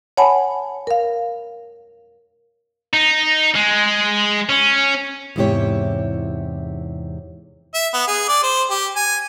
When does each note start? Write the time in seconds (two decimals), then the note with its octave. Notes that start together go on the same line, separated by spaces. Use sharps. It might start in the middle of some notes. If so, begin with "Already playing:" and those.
0.17 C#5 F#5 G#5 A5 B5
0.87 A#4 F5
2.94 D#4
3.56 G#3
4.49 C#4
5.36 E2 G#2 C3 E4 G4 C#5
7.74 E5
7.94 B3
8.08 G#4
8.28 D5
8.43 C5
8.70 G4
8.96 G#5